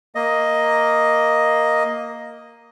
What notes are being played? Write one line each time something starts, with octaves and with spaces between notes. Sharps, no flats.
A#3 D#5